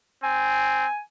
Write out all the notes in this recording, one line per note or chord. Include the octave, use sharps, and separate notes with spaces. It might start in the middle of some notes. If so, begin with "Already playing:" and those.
C4 G#5